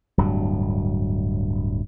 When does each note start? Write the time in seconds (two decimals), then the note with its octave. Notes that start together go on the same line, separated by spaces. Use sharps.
0.18 D1 G2 F#3